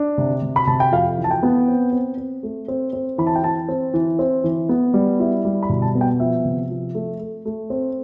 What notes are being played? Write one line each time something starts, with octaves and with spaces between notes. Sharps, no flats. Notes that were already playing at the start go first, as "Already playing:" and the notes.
Already playing: D4
C3
C3
B5
C3 A5
G5
F2 F5
E3
A5
G5
B3
C4
C4
C4
A3
C4
C4
E3 B5
A5
G5
E3 A5
C4
E3
C4
E3
B3
G3
E4
G3
B5
B2
A5
B3
G5
F3 E5
C3
F3
A3
A3
A3
C4